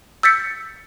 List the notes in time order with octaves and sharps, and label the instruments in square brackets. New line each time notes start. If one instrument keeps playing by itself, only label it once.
[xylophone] E6 G6 A6 B6 C#7